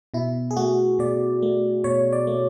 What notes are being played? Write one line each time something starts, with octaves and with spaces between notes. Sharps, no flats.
B2 E4
G#4
A3 F#4
B2 D5
A3
B2 C#5
D5
A3